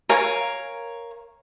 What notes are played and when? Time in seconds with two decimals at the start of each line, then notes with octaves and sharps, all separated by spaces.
0.09 A#4 C#5 F5 G#5